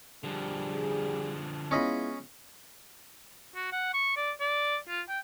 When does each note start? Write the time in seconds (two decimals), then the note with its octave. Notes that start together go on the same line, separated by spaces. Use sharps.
0.24 D3 F3 G3 G#4
1.71 G#3 B3 C#4 E4 F4 D#5 B5
3.55 F#4
3.72 F#5
3.94 C#6
4.17 D5
4.40 D5
4.88 F4
5.09 G5